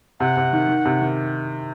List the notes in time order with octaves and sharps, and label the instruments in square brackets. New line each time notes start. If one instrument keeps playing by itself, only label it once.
[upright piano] C3 [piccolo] F#5
[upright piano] C3
D#3
D#3
C3
D#3